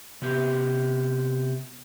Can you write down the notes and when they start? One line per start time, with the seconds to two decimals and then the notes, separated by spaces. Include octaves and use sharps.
0.22 C3 B3 G4